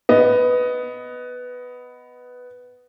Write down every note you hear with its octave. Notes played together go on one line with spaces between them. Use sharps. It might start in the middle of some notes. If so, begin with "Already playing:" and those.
B3 D#5